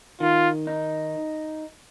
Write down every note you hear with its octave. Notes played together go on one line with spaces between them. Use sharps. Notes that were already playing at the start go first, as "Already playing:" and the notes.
D#3 F4
D#4